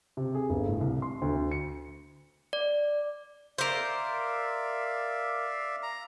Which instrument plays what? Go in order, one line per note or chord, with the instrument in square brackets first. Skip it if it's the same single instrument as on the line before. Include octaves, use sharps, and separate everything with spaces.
[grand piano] C3
G#4
G1
A2
C2
C6
D2
C#7
[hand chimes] D5
[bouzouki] A#4 C5 [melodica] D5 E5 F5
[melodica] A#5